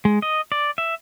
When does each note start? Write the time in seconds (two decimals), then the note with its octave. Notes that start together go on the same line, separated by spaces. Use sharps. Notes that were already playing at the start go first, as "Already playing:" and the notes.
0.05 G#3
0.22 D#5
0.52 D5
0.78 E5